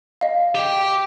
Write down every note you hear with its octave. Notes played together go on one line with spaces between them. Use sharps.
D#5 F5
G4 G5